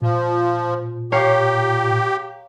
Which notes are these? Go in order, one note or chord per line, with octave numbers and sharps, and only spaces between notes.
A#2 F3
G4 C#5 F5 A#5